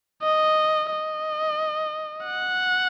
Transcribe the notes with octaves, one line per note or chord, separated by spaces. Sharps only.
D#5
D#5
F#5